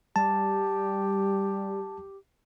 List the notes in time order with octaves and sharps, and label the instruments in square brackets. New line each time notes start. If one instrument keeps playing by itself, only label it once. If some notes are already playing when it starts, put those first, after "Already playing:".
[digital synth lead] G3 [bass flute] G4 [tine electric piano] A5